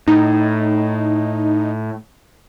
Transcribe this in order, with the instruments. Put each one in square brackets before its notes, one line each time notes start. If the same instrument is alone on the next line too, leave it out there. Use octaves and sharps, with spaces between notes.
[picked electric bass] A2 [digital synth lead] D#4